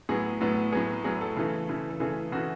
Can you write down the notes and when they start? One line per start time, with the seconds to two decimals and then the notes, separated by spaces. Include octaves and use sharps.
0.09 A2 F#3 B3 G#4
0.41 A2 F#3 B3
0.72 A2 F#3 B3 G#4
1.04 A2 F#3 B3 G#4
1.21 A4
1.36 C#3 E3 A3
1.69 C#3 E3 A3
1.90 A4
2.00 C#3 E3 A3 G#4
2.32 C#3 E3 A3 F#4